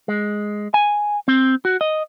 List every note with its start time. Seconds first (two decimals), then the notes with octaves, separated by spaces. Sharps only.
0.08 G#3
0.74 G#5
1.28 C4
1.65 F#4
1.81 D#5